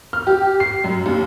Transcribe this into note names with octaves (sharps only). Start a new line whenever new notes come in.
F6
G4
C7
F#2
D#2